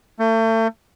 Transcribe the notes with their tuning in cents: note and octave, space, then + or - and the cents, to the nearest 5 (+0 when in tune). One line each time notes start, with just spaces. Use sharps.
A3 +35